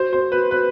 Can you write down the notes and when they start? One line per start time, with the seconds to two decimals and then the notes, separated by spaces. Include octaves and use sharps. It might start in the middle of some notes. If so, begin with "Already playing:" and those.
Already playing: F#4 C5
0.13 C5
0.32 B4
0.51 B4